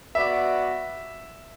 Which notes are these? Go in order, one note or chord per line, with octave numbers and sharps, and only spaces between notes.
B3 F#4 B4 D5 E5